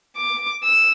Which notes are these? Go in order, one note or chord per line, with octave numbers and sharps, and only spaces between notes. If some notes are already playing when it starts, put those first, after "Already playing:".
D6
E6